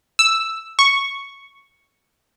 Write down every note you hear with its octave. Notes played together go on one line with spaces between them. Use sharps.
E6
C#6